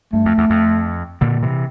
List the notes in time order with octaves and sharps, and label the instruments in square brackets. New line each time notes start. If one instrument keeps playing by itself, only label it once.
[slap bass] G2 [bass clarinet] A3
[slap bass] F2
E2
F2
A#2 D3
C3 E3